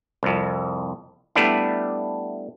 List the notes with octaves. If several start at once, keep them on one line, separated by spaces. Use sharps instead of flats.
C2 F2
G3 A3 B3 D4 E4